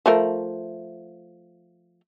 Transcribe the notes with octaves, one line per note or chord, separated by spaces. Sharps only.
F3 A3 A#4